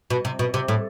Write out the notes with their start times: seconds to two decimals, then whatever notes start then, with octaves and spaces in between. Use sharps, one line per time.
0.10 B2
0.25 C3
0.39 B2
0.54 C3
0.68 A2